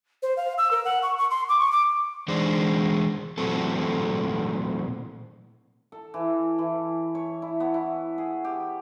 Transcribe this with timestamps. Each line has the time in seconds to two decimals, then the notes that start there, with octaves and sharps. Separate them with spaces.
0.23 C5
0.37 F5
0.58 E6
0.71 A#4
0.85 F#5
1.02 C#6
1.18 C#6
1.31 C6
1.48 D6
1.60 C#6
1.72 D6
2.28 E3 G#3 D4 C5
3.38 A#2 E3 F#3 A3 C4 A4
5.92 A4
6.14 E3
6.58 E3
7.15 C#5
7.42 E4
7.60 B3
7.74 E4
8.18 G#4
8.44 G4